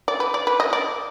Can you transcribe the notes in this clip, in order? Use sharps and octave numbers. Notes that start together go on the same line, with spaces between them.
D5
B4
D5
B4
D#5
D5